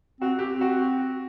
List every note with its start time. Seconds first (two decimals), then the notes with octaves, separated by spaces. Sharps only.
0.21 C4 F#4
0.38 C4 G4
0.61 F#4